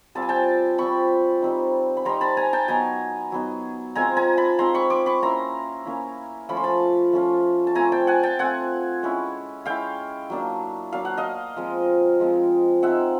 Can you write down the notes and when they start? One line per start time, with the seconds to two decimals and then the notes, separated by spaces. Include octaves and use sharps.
0.15 G3 C4 F4 A5
0.22 G#5
0.29 G5 A5
0.78 G3 C4 F4 B5 C#6
1.42 G3 C4 D#4
1.97 B5
2.05 G3 C4 D#4 A#5 C6
2.21 A5 B5
2.37 G#5 A#5
2.53 G5 A5
2.68 F#3 B3 D#4 G#5 A#5
3.32 F#3 B3 D#4
3.95 G#3 C4 F4 G#5 A#5
4.17 G#5 A#5
4.37 A5 B5
4.59 G#3 C4 F4 A#5 C6
4.74 B5 C#6
4.90 C6 D6
5.06 B5 C#6
5.22 A#3 C#4 E4 A#5 C6
5.85 A#3 C#4 E4
6.49 F3 A3 C#4 F4 B5
6.57 C6
6.64 A5 B5
7.12 F3 A3 C#4 F4
7.67 A5
7.75 A3 C4 F4 G#5 A#5
7.92 G5 A5
8.07 F#5 G#5
8.23 G5 A5
8.39 A3 C4 F4 F#5 G#5
9.03 G#3 C#4 E4
9.65 G#3 C#4 E4 F5 G5
10.30 F#3 A#3 D4
10.92 F#3 A#3 D4 F5
11.05 F#5
11.17 D#5 F5
11.56 F3 G#3 C4
12.20 F3 G#3 C4
12.83 G#3 C4 D#4 E5 F#5